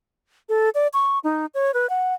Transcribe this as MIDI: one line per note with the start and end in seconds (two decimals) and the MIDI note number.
0.49 0.70 69
0.75 0.87 74
0.93 1.19 85
1.24 1.46 63
1.54 1.71 73
1.74 1.89 71
1.90 2.14 78